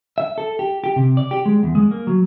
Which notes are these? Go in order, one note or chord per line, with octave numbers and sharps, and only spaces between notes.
E5
A4
G4
G4
C3
D5
G4
G#3
E2
G#3
A#3
F#3